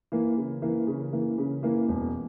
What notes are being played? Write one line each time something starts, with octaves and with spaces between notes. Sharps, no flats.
E3 A#3
C#3
E3 A#3
C#3
E3 A#3
C#3
E3 A#3
E1